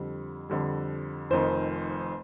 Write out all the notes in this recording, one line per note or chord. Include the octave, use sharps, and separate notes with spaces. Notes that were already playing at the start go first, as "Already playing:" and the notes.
Already playing: F2 D3 G3
F2 D3 G3
F1 F2 D#3 C5